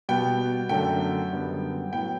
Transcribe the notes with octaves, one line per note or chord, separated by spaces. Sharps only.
B2 G3 B3 G5
F#2 D3 A3 G5
F#2 D3 G3 B3
A2 F#3 B3 G5